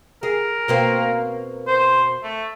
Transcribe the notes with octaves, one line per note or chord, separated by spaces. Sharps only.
G#4 A#4
B2 A#3 C4
C5
A3